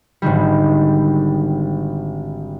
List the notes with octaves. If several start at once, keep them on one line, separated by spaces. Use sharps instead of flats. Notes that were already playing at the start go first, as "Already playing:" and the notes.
G#1 D3 D#3 G3